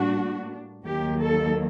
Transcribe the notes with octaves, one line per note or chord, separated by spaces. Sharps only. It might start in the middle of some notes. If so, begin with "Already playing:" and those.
Already playing: A2 G3 A#3 D4 F#4
D#2 D#3 F#3 A#3 G4
A4